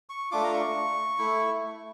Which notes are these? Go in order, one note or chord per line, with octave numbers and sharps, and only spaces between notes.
C#6
A3 D4 F4 D6
A#5
C#6
A3 E4